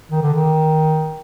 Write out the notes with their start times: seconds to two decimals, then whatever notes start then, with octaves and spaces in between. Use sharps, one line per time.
0.11 D#3
0.22 D3
0.34 D#3